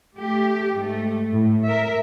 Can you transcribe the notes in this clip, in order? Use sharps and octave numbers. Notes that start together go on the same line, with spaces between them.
A3 G4
G#2 A3
A2
A#4 E5